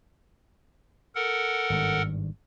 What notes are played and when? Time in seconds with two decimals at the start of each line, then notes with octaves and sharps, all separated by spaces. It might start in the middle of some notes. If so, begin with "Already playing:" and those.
1.15 A4 A#4 F#5
1.70 G#1 G2